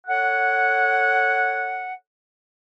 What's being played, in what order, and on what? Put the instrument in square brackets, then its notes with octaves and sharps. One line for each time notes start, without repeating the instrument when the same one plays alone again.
[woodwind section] A4 C#5 F#5